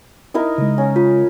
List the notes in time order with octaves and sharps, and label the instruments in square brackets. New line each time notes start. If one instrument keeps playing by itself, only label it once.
[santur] D#4 E4 A#4
[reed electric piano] C#3 G#3 [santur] D#5
[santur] C#4 D#6
[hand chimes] F4